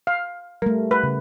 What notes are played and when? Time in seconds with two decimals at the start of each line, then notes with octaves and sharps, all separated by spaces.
0.07 F5
0.62 G3 A3 A#4
0.91 B4
1.03 C#3